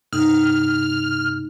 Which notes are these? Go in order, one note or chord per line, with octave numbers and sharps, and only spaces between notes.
G2 C3 A3 D#4 F6